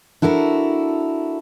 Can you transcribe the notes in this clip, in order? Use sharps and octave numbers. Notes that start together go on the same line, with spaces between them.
D4 E4 F#4 A4 A#4